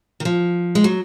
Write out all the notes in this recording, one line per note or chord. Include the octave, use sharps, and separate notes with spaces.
D#3
F3
G#3
F#3